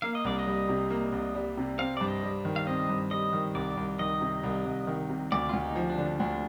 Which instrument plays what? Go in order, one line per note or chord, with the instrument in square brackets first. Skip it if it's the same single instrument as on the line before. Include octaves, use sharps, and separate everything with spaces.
[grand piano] A#3 [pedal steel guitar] F5
[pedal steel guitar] D#5
[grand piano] C2 [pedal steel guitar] D5
[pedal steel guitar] D#5
[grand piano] G3
C3
A#3
C2
G3
C3
[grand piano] C4 [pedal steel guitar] F5
[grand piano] G2 [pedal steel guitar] D5
[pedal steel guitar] D#5
[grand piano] G3
D#3
[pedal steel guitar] F5
[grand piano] C4 [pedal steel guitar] D#5
[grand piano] G2
[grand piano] G3 [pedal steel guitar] D#5
[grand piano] D#3
[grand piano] C2 [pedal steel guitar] D5
[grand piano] C2
[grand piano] D#3 [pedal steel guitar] D#5
[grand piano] C3
C2
C2
D#3
C3
[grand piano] D2 [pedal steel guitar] D5
[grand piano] D2 [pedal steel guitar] F4
[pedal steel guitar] D#4
[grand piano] F3
[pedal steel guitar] D4
[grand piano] D3
[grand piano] D2 [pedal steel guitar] D4